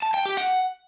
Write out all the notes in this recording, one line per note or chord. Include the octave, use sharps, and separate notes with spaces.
A5
G5
G4
F#5